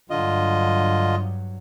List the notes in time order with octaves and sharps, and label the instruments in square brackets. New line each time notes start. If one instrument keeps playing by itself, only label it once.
[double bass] G2 F#3 [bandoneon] D3 F4 D#5